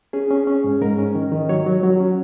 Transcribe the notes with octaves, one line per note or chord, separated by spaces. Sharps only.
C#4 G#4
C#4
C#4
G#2
G#2 A#4
C#4
D#3
D#3
F#3 C#5
F#3
F#3
C#4